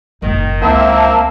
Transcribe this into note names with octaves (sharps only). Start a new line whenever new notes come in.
F#1 A#2 D#3
C#2 D#3 A#3 C4 E4 E5 A5